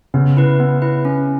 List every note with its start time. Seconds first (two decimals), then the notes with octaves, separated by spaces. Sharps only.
0.14 C#3 B3
0.37 E4 B4
0.60 B3
0.82 E4 B4
1.05 C#4